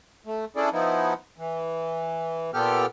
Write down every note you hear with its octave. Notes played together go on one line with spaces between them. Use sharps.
A3
C#4 D4 E4 G#4 A4 D5
F3 B3 D#4 E4
E3
A#2 B3 G4 A4 G5 F6